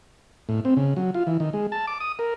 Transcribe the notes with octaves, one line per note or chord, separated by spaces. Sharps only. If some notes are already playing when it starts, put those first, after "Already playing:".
A2
C4
C#3
F#3
F4
E3
D#3
G#3
A5
D6
D#6
A#4